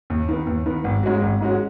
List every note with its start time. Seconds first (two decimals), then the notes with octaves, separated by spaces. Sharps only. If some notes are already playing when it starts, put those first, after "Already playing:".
0.10 D#2
0.29 D#3 B3
0.47 D#2
0.66 D#3 B3
0.84 G#1
1.03 G#2 G#3 C#4 F#4
1.22 G#1
1.41 G#2 G#3 C#4 F#4